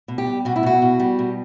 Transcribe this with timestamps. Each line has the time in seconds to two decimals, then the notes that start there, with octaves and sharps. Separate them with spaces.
0.08 B2
0.18 G4
0.26 G3
0.45 B2 F#4
0.56 E4
0.63 B2 F#4
0.82 B2
1.00 G3
1.19 B2